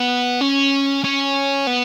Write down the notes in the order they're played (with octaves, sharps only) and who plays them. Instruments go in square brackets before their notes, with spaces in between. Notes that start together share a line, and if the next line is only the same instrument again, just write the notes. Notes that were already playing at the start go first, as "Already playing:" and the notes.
Already playing: [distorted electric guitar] B3
C#4
C#4
B3